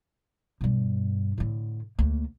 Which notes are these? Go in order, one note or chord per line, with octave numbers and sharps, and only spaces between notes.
G2 B2
A2 D3
D2 A#3